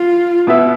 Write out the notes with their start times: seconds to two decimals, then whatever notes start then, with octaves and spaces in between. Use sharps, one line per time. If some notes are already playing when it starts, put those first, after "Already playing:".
Already playing: F4
0.47 B2 B3 E4 B4 E5